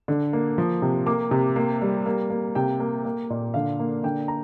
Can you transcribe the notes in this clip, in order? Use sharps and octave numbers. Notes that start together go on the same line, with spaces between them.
D3
A#3
F3
C3
A#3 D6
C3
A#3
G3
A#3
A#3
C3 G5
A#3
A#3
A#2
D3 F5
A#3
D3 G5
A#5